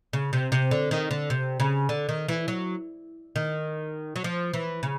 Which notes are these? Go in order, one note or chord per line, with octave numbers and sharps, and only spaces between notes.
C#3
C3
C3
D3
D#3
D3
C3
C#3
D3
D#3
E3
F#3
D#3
F#3
F3
E3
C#3